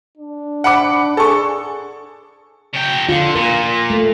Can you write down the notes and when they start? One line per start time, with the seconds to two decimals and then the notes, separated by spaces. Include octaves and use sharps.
0.17 D4
0.64 F#5 B5 D6
1.17 G#4 A4 C#6
2.73 C#3 G5
3.09 D3 F4
3.35 A#2 A#4
3.90 A3